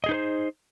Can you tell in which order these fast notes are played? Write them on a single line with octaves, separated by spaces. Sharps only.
D#5 G#4 D#4 B4 C5